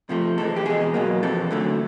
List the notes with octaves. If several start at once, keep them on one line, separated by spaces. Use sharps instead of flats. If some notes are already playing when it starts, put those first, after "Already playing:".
C3 F3 A3
C3 E3 G#3 A4
G4
E2 B2 G#3 G#4
B2 F#3 A#3
F2 C3 E3 A4
F#2 D3 F#3 A3